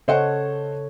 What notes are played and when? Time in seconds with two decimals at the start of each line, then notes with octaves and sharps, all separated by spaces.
0.08 C#3 A4 C5 C#5 D#5 F#5